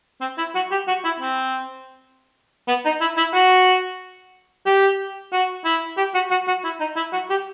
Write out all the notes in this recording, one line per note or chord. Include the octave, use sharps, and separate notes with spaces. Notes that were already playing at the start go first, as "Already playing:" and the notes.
C4
E4
F#4
G4
F#4
E4
C4
B3
D#4
E4
E4
F#4
G4
F#4
E4
G4
F#4
F#4
F#4
E4
D#4
E4
F#4
G4